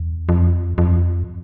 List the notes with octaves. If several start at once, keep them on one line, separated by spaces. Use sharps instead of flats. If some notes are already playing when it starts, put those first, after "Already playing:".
Already playing: E2
F2
F2